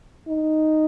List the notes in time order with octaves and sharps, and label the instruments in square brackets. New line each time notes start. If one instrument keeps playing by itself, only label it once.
[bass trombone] D#4